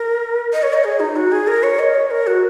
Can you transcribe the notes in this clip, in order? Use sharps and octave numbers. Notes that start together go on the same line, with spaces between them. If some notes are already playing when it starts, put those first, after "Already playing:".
Already playing: A#4
D#5
C#5
D#5
G#4
D#4
F#4
G#4
A#4
C#5
D#5
C#5
A#4
F#4